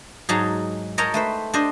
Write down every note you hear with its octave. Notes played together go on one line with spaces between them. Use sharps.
G#2 F#3 D#4 G#4 A5
A#4 C#5 D#5 G5 A5 A#5
A3 B4 C5
D4 G4 C5 D#5